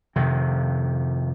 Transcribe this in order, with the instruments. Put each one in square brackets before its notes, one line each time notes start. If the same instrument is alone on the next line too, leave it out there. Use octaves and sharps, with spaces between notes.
[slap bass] F2 C3 D#3